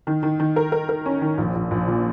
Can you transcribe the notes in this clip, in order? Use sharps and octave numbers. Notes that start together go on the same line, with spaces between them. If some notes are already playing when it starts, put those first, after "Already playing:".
D#3
D#3
D#3
A#4
A#4
A#4
C#4
D#3
A#1
A#1
A#1
A#2